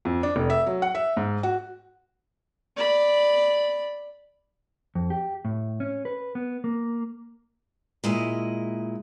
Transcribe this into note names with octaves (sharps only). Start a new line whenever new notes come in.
F2
D4
F1
E5
F#3
F#5
E5
G#2
F#4
D5 B5
F2
G4
A2
C#4
B4
B3
A#3
A#2 G#3 E4 D#5